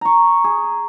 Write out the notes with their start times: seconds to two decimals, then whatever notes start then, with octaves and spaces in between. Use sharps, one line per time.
0.01 A#5 C#6
0.44 G#4